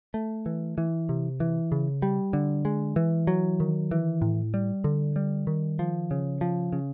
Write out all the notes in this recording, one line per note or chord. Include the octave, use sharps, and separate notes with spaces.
A3
E3
E3
C3
E3
C#3
G3
D3
G#3
E3
F#3
D#3
E3
A2
G3
D3
G3
D#3
F3
C#3
F3
C#3